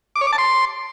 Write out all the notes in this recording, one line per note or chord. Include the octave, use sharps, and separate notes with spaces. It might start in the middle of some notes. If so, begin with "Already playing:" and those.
D6
C#5
D6
A5
C6